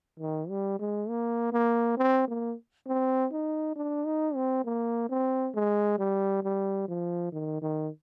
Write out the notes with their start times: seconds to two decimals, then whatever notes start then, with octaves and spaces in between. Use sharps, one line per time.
0.20 D#3
0.49 G3
0.79 G#3
1.09 A#3
1.53 A#3
1.97 C4
2.28 A#3
2.87 C4
3.32 D#4
3.76 D4
4.06 D#4
4.35 C4
4.65 A#3
5.09 C4
5.54 G#3
5.99 G3
6.43 G3
6.88 F3
7.32 D#3
7.62 D#3